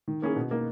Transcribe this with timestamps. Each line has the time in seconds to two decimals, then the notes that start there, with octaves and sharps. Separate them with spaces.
0.08 D#3
0.22 A#3 C#4 E4 G#4
0.36 B2
0.51 A#3 D#4